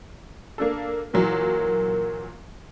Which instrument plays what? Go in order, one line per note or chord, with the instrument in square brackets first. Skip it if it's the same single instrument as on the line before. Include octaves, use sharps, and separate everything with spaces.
[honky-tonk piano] A#3 D4 A4
[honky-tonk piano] A#2 E3 F#3 [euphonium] A#4